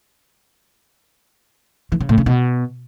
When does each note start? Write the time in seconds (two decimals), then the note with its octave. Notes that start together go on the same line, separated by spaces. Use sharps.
1.92 E3
2.01 C#3
2.09 A2
2.18 C#3
2.26 B2